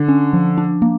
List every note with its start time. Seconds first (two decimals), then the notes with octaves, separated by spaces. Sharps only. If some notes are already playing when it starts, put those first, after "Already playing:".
Already playing: D3
0.08 C#4
0.33 F3
0.58 D4
0.82 A#3